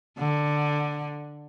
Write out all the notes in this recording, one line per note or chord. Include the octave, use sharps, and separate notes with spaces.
D3